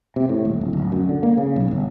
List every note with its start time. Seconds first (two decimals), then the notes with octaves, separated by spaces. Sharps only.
0.16 C3
0.29 A2
0.45 D#1
0.61 D1
0.73 D1
0.92 F#2
1.09 D3
1.23 A#3
1.37 C#3
1.56 B1
1.71 G1